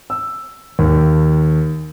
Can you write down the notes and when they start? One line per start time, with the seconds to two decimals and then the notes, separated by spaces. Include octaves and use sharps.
0.10 E6
0.79 D#2